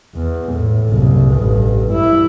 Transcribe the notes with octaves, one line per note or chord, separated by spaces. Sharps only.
E2
A2
F#1 C2
A1 G2
G2 E4